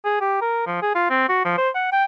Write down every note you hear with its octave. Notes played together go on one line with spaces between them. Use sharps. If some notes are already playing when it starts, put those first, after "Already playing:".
G#4
G4
A#4
F3
G#4
F4
C4
F#4
F3
C5
F#5
G5